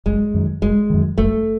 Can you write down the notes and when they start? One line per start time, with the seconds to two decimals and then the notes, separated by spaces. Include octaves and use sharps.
0.06 F#1 G#3
0.34 F#2 D#3
0.62 F#1 G#3
0.90 F#2 D#3
1.18 F#1 A3